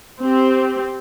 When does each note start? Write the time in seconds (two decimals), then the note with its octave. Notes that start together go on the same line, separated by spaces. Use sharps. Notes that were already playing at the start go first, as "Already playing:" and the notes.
0.21 C4 G4